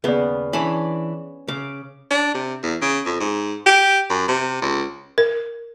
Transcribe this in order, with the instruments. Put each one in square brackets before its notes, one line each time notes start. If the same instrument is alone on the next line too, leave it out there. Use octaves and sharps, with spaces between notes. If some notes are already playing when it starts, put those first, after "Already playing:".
[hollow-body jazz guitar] D#2 C#3 [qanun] B3 [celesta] G#4 D5
[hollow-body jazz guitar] E3 D4 [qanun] C#4 B5
[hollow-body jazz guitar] C#3 [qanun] D6
[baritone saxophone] D4
C3
E2
C#3
F2
G#2
G4
F#2
C3
C#2
[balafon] A#4